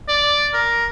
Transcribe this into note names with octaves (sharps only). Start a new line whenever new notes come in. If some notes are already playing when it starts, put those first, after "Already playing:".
D5
A#4